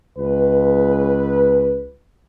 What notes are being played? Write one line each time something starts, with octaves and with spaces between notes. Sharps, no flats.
C#2 B4